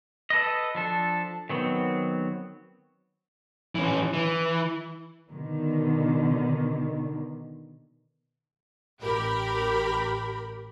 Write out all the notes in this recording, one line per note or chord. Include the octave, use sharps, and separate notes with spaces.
A4 B4 D#5
F3 D4 A4
D#3 F#3 B3 C4
E3 C#4
E3
B2 D3 D#3
A1 G4 A#4 B5